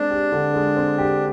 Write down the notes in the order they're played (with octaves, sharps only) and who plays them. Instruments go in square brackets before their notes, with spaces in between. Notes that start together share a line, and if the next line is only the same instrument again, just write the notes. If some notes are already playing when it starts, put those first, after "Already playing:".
Already playing: [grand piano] G#3 C4 [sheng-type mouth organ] D4
[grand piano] G4
D3
G#3
C4
G4